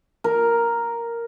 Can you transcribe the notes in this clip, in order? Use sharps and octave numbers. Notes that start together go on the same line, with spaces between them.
A#4